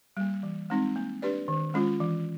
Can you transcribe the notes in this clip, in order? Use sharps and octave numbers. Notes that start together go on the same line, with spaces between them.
G3 A#3
E3
G#3 C4 D#4
A#3
D4 G4 B4 D5
D#3
G#3 C#4 F4
E3